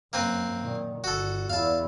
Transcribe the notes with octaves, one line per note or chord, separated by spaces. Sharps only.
F#2 A#3 C4 B4
A#2 D#3
G1 F#4 A4
E2 E4 F5 A5